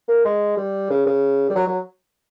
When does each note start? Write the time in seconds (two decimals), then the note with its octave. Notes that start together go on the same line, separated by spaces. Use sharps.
0.08 A#3
0.25 G#3
0.57 G3
0.90 C#3
1.06 C#3
1.50 G3
1.55 F#3
1.67 F#3